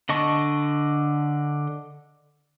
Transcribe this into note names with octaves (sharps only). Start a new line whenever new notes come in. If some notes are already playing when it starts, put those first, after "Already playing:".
D3 D#5 A5 C#6